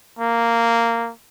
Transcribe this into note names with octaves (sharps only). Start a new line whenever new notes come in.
A#3